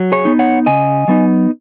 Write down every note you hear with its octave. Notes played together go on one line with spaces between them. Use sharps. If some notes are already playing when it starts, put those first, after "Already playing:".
Already playing: F#3
G#4 C#5
B3 D#4
C#5 F#5
C#3 D#5 G#5
F#3 B3 D#4